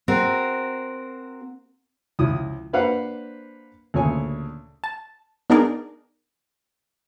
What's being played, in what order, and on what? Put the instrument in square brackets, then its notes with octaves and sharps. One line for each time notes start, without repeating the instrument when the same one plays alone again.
[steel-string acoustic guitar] C4 F#4 A#4
[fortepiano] C#2 F3 E4 D#6
A#3 D4 B4 C5 F5 F#5
D2 A#2 C#3 C#5 G#5
[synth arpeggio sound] A5
B3 D4 D#4 G#4 A#4 D5